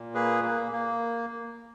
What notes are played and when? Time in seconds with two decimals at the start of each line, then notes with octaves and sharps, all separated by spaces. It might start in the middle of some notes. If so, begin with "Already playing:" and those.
Already playing: A#2
0.14 A#3 G#4 B4
0.43 A#3
0.72 A#3